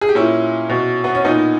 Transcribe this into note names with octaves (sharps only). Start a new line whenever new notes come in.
G#4
G4
A#2 C#4 E4
B2
B3
C#4
A#2 B3 D#4